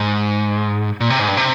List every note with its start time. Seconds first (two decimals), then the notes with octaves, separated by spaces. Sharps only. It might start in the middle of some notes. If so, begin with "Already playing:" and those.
Already playing: G#2
1.00 A#2
1.10 C3
1.19 G#2
1.28 G2
1.37 C3